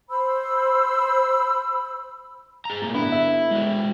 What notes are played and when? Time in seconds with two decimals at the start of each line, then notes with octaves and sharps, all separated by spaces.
0.10 C5 B5 E6
2.65 G#4 A#5
2.82 A2 A#3
2.94 G2 D3 B3 E4
3.12 E5
3.51 G#3 F#4